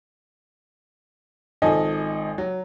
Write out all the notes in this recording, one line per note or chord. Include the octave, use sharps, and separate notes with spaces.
G#1 F3 A4 D#5 G#5
F#3